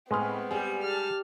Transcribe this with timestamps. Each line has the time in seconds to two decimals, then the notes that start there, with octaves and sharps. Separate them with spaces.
0.11 A2 G#3 B3 C4 B4 F6
0.51 G3 G4 G#4
0.83 A5 F6